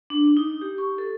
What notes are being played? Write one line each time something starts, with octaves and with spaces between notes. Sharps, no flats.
D4
D#4
G4
C#6
A4